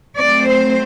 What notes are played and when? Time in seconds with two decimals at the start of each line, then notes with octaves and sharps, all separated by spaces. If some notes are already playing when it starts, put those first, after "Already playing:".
0.17 F#3 A3 C4 D5
0.46 C5